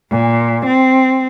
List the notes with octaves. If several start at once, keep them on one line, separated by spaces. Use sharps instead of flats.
A#2
C4